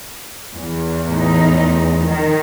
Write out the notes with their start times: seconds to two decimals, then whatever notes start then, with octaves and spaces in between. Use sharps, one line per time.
0.54 E2
1.06 A2 E3 D#4
2.06 D#3